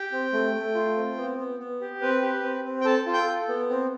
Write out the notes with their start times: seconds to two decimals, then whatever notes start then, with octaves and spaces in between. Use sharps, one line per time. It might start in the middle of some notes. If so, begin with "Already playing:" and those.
Already playing: G4 G5
0.12 C4
0.33 A3
0.54 A3
0.75 F4
0.96 C4
1.17 B3
1.38 B3
1.60 B3
1.81 G4
2.01 C4 B4
2.22 G4
2.43 C4
2.65 C4
2.81 G5
2.85 A4 A5
3.06 F4
3.13 G5 G6
3.28 A4
3.49 B3
3.70 C4